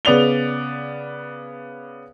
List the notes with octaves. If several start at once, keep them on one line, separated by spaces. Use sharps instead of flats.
C#3 B3 D5 F7 G7